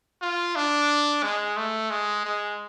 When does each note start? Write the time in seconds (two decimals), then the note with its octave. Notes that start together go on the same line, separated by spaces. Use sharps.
0.22 F4
0.56 D4
1.23 G#3
1.57 A3
1.90 G#3
2.25 G#3